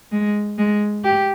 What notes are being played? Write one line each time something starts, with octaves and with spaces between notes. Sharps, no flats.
G#3
G#3
G4